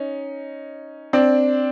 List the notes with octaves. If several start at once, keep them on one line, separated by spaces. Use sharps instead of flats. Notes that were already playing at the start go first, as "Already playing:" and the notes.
Already playing: C#4 D#4
C4 D4